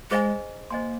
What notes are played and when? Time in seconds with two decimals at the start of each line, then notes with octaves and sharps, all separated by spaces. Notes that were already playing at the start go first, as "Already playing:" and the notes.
0.10 G#3 G#4 C5 D#5 G#5
0.70 A#3 C5 D#5 G#5 C6